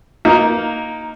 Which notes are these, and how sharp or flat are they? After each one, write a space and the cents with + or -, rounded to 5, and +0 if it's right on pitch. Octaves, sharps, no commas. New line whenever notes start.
A#3 +0 D#4 +10